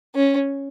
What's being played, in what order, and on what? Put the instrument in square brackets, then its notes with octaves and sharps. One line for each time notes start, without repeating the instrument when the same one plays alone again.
[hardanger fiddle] C#4